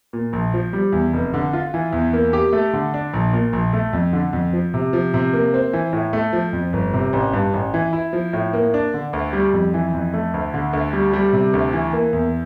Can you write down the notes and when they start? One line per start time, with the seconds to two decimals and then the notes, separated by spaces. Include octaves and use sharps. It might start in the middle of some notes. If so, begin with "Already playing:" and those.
0.13 A#2
0.33 A#1
0.54 F3
0.73 G3
0.93 E2
1.13 F1
1.34 D3
1.53 F4
1.74 E3
1.93 E2
2.13 A#3
2.33 G4
2.53 A3
2.73 D3
2.94 D4
3.14 A#1
3.33 A#2
3.53 A#1
3.73 A3
3.93 F2
4.13 D3
4.33 F2
4.53 F3
4.74 C3
4.93 F3
5.14 C3
5.33 A#3
5.54 C4
5.73 E3
5.93 A2
6.13 A3
6.33 F3
6.53 F2
6.73 G1
6.94 C3
7.13 A1
7.33 G2
7.54 A1
7.74 E3
7.93 E4
8.13 F3
8.33 A2
8.53 A#3
8.74 D4
8.94 D3
9.13 D2
9.33 G3
9.54 F2
9.74 E3
9.93 F2
10.14 A3
10.34 D2
10.54 D3
10.73 D2
10.93 G3
11.13 G3
11.33 C3
11.53 D2
11.73 E3
11.93 A#3
12.13 E2